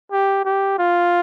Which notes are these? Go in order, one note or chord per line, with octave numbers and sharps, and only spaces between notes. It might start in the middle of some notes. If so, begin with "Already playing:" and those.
G4
G4
F4